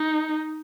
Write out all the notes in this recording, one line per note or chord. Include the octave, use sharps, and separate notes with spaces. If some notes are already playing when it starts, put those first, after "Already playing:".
Already playing: D#4